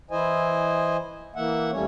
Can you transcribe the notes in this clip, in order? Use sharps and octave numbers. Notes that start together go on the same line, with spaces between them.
E3 E4 C5 D#5 G#5
E3 A#3 E5 F#5
D#2 G3 A3 C#4 C#5